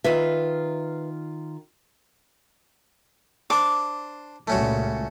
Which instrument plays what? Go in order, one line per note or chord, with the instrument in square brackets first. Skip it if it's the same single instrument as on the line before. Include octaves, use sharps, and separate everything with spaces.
[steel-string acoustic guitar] D#3 F4 [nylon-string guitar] B4 E5
[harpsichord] D4 C5 [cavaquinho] D6
[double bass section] C#2 A#2 G3 [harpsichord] A3 C#4 F#4